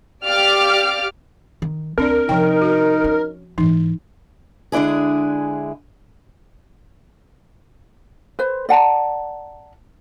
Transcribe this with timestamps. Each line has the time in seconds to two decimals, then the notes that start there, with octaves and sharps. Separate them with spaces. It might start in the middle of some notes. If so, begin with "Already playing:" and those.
0.25 G4 D5 F5 D6 F6
1.62 D#3
1.98 D2 B3 C4 D4 A#4 D5
2.29 C3 F3 D#4 G5
2.62 F#4
3.04 C#4
3.58 G#2 E3 D#4
4.72 D3 G#3 D4 E4 G#4
8.39 B4 C5
8.69 D5 F#5 A5 A#5